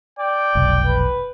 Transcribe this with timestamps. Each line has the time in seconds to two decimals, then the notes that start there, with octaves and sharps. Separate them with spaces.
0.19 D5 G5
0.55 F1 B1
0.84 B4